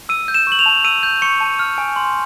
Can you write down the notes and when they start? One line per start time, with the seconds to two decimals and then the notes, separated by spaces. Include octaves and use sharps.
0.09 E6 D#7
0.28 G6
0.35 E7
0.47 C#6 F#7
0.59 F7
0.66 A5
0.84 E6 D#7
1.03 G6
1.22 C#6 C#7
1.40 A5
1.59 F6
1.78 G#5
1.96 C6